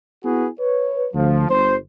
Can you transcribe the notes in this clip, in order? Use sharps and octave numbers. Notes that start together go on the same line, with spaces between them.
B3 E4 F#4 G#4 B4
B4 C#5
D2 F3
G1 C5